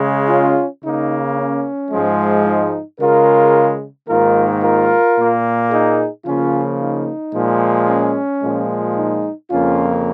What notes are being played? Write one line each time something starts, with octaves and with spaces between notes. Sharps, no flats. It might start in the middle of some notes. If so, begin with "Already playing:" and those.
Already playing: C#3 G#3
C#4 F4
C#3 A#3 D#4
C#4
G#2 F3 G#3
D#4
C#3 G#3 F4 A#4
G#2 D#3 A#3 F4 A#4
F4 A#4
A#2 A#3
D#4 G#4
C#3 F3 A#3 C#4 F4
D#4
A#2 F3 G#3
C#4
A#2 F3 G#3
D#4
F2 C#3 A#3 C#4 F4